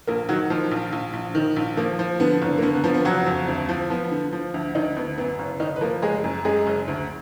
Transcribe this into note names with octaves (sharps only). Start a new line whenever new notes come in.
A#1 A#3 A#4
D#3 F#3 F#4
D#3 F3 F4
A#1
A#1
A#1
D#3
A#1
F3 A#3
F3
D3 B3
F#1
A#3
D3 B3
B3
F3 B3
B3
F#1 F#3 F#4
F2
D2
F3
F3 B3
D3
F3
D2
D2 D#3 D#4
D2 B3
F#2 B3
F#1
F#1 D#3 D#4
B4
F3 A#3 A#4
F#1 G#3 G#4
F#2
F#2 G#3 G#4
F#1
D2